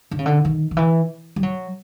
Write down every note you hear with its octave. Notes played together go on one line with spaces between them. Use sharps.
D3
C#3
D3
D#3
D#3
E3
G3
F#3